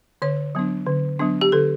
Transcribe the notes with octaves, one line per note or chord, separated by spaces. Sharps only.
D3 C#5
F#3 B3 D4
D3
F#3 B3 D4
G4
D3 A4